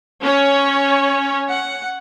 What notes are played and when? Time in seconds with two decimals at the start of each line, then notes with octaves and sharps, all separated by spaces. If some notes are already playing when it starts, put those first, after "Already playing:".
0.21 C#4 C#5
1.50 F#5